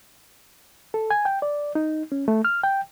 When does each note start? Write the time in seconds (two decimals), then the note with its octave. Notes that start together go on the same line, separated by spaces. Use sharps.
0.94 A4
1.10 G#5
1.25 G5
1.42 D5
1.75 D#4
2.12 C#4
2.28 A3
2.45 F6
2.63 G5